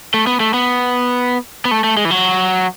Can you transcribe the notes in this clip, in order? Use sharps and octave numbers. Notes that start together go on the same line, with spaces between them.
A3
B3
A3
B3
B3
A3
A3
G#3
E3
F#3